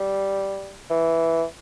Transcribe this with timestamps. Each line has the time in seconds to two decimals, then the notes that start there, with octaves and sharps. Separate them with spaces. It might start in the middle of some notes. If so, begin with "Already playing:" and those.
Already playing: G3
0.90 E3